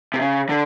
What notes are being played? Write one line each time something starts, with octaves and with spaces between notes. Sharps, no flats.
C3
C#3
D3